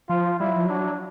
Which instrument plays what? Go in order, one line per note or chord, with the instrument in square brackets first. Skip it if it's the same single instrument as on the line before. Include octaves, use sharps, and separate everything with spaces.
[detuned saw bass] F3 [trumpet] F4
[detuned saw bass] G3 [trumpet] E4
[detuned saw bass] F#3
F3
[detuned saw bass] F#3 [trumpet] D4